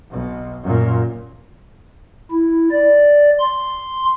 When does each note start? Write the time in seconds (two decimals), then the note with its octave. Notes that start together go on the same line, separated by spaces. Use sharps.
0.11 B1 B2
0.64 F#2 A#2
2.31 E4
2.71 D5
3.39 C6